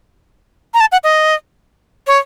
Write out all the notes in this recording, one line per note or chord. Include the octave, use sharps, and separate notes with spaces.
A#5
A5
F#5
D#5
C#5